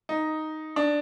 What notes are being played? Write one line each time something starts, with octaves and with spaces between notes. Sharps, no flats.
D#4
D4